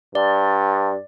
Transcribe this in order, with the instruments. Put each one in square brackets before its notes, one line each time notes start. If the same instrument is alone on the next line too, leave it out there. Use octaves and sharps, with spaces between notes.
[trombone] G2 [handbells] D5